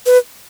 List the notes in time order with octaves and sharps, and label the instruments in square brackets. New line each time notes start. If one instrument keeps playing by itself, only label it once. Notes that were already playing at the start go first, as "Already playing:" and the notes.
[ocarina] B4